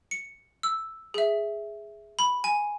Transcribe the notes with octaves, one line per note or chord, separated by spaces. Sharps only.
C#7
E6
G#4 E5
B5
G#5